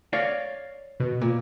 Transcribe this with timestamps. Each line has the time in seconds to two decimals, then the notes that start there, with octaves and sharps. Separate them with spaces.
0.13 C#5 D5 F5
1.00 B2
1.21 A#2